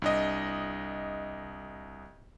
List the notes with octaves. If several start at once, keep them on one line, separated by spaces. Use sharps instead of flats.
C2 D4 D#5